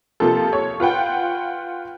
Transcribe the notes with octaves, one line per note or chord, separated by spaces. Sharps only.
C3 F3 A#3 F4 A4
C#5
F4 B4 F#5 G5